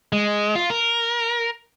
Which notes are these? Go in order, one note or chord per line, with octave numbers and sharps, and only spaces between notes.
G#3
F4
A#4